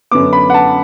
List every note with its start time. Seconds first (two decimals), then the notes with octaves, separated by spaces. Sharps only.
0.11 F#2 D3 B3 D6
0.33 B5
0.50 F#5
0.54 A5